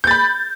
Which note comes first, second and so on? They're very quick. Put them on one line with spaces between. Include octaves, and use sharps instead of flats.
G6 A6 B5